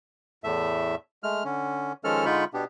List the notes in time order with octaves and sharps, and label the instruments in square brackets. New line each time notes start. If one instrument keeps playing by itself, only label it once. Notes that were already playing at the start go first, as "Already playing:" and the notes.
[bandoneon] E2 A2 A3 E5
G#3 A3 F6
D3 C#4
D#3 F3 G#3 C#4 A4 F6
D3 G#3 D#4 F4 B5 C#6
B2 B3 D4 G4